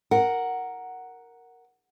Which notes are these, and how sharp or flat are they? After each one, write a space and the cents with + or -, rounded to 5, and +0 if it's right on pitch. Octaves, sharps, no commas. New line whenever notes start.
A#4 +0 F#5 +0